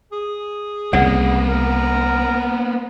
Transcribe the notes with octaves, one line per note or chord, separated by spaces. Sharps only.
G#4
C2 C#3 A#3 B3 D5 F#5
A#4